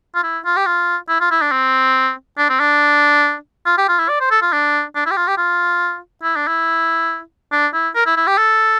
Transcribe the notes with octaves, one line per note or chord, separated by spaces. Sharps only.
F4
E4
F4
G4
F4
E4
F4
E4
D4
C4
D4
C4
D4
F4
G4
F4
E4
D5
C5
A4
F4
D4
D4
E4
G4
F4
G4
F4
E4
D4
E4
D4
E4
A#4
E4
E4
G4
A4